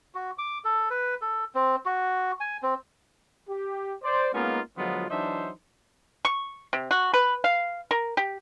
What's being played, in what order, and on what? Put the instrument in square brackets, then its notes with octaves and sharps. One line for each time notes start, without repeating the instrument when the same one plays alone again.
[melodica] F#4
D6
A4
B4
A4
C4
F#4
G#5
C4
[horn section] G4
C5 D5
G#3 A#3 B3 C#4 D#4 F4
D3 F3 F#3 G#3 B3 F4
E3 F#3 D4 D#4 C5 E5
[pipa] C#6
C3
F#4
B4
F5
A#4
G4